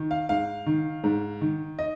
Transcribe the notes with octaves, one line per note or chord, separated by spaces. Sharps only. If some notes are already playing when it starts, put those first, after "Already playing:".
Already playing: D#3
F5
G#2 F5
D#3
G#2
D#3
D#5